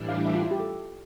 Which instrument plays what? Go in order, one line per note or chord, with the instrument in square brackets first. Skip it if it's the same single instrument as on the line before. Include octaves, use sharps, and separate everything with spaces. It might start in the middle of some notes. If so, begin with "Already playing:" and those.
Already playing: [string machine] A2 E3 G3 D4
[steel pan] F5
E5
F4
E4
G4
A4